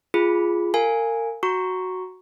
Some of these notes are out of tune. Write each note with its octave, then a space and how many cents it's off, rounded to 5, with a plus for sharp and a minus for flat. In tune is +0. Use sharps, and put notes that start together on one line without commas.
F4 -10 G#4 +0 B5 +0
A#4 -30 F5 +0 G#5 -5
F#4 +0 A#5 +0 C#6 +0